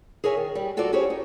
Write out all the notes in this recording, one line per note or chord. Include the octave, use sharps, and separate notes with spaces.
G#4 A#4 C#5 E5 G#5
D#3
G3
F4 F#4 A4 A#4 D5
C#4 E4 G4 G#4 C5 C#5
D#4